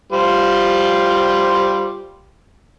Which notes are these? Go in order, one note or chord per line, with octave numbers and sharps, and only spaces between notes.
G3 F4 C5